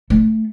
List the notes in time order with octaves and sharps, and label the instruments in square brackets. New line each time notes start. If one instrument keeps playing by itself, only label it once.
[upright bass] A3